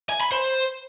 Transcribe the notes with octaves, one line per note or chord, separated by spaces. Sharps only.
G#5
B5
C5